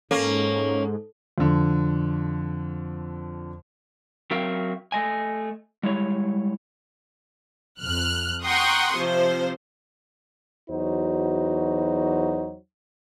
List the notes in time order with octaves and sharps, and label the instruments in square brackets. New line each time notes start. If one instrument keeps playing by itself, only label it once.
[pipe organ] G#2 [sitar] A#3 C#4 [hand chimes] A4
[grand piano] F2 D3
[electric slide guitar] F#3 C4 A#4 E5 F5 G5
A3 D#5 G#5
G3 G#3 E4 C#5
[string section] F2 F6 F#6
F#5 G5 A#5 C6 C#6 D#6
C3 F3 C5
[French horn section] E2 F#3 D#4 F#4 C5